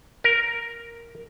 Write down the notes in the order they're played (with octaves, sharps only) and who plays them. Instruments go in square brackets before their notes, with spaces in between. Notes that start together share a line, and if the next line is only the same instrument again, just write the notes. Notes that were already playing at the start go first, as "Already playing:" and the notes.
[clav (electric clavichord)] A#4